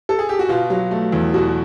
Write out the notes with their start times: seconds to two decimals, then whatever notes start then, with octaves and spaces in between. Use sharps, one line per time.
0.09 A4
0.19 G#4
0.29 G4
0.39 F#4
0.49 B2 F4
0.70 F#3
0.91 A3
1.12 E2
1.34 B2 F#4